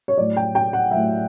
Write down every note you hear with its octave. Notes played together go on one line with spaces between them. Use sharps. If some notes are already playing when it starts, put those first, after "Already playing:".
C#5
A2 F#3 D5
G5
G5
F#5
F#3 E5
A2